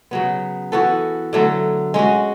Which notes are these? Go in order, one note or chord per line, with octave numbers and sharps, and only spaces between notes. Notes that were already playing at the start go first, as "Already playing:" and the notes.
C#3 F#3 B3
E3 B3 F#4 A4
D3 F#3 A3
G#3 C#4 F#4